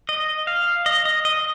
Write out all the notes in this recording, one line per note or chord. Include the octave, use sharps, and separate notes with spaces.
D#5
F5
D#5
D#5
D#5